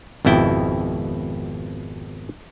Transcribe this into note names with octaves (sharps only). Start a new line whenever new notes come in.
G#1 F2 B2 E4 G5